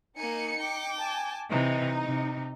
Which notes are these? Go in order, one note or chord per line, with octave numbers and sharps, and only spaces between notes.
A#3 D#4 G#5 C#7
G5 D6
G#5 A5
C3 E3 D#4
C3